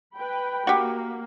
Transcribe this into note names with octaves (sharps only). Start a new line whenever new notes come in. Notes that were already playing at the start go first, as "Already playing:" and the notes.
B4 G5 B5
A#3 F#4 G4